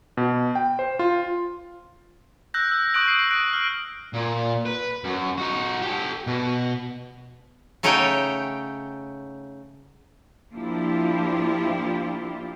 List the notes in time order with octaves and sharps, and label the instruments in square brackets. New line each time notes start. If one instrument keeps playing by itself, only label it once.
[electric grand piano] B2
G5
C5
F4
[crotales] E6 F#6 G6 A#6
E6 G6
C#6 D#6 F#6 G6 D7 F#7
C7 D7
F#6 D7
F6
[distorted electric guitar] A#2
B4
F#2
D#4 F#4
G4 A4
B2
[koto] C#3 A3 D#4 C#5 F#5 G5
[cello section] F3 A#3 D4 E4 F4 G4